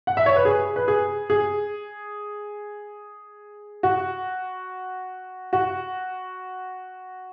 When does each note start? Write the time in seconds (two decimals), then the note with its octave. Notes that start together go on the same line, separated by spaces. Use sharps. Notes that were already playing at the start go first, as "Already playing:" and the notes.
0.07 F#5
0.17 E5
0.26 C#5
0.36 B4
0.45 G#4
0.76 B4
0.88 G#4
1.30 G#4
3.83 F#4
5.53 F#4